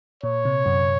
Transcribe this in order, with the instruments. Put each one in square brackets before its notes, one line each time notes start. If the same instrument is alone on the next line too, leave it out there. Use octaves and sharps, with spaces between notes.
[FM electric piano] A#2 [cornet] C#5
[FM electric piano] C3
F#2